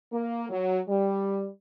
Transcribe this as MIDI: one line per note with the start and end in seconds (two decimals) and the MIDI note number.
0.12 0.45 58
0.50 0.79 54
0.89 1.47 55